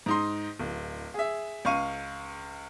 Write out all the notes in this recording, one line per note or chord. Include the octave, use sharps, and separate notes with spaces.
G#2 D#4 C6
D1
G#4 E5
C#2 F5 C#6 D#7